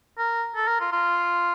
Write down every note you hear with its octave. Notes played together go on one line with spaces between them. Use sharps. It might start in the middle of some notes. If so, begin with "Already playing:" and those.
A#4
A4
A#4
F4
F4